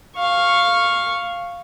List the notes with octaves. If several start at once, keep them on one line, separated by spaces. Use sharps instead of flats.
F5 C#6